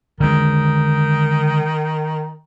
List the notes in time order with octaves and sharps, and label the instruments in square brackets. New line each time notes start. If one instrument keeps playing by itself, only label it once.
[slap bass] D3 G#3 [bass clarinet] D#3